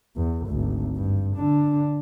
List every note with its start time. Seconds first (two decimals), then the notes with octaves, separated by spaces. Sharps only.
0.17 E2
0.48 G#1 D2
0.96 G2
1.37 D3 D4